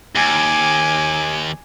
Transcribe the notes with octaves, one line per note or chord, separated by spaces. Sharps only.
D#2 G#5 D6